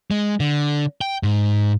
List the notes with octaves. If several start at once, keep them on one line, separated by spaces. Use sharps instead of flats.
G#3
D3
G5
G#2